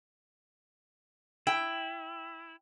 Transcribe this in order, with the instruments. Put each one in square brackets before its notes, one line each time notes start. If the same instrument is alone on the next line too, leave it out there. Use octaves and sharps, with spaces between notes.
[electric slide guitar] E4 [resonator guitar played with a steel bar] G5